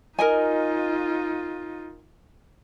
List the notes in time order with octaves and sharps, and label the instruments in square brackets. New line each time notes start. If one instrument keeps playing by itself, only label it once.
[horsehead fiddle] D#4 F4 [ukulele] A#4 D#5 G#5